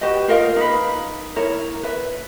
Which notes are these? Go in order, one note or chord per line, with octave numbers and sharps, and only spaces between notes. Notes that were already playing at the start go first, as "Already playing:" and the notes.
F#4 G4 B4 D#5
F4 A#4 D#5 F5
D#4 B4
E4 A#4 C#5
B4 E5